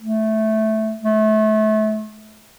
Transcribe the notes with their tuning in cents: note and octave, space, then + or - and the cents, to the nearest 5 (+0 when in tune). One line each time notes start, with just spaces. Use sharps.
A3 -10
A3 -30